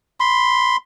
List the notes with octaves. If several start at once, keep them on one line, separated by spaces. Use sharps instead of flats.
B5 C6